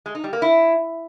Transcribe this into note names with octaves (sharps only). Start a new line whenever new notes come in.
G#3
D#4
G3
A#3
E4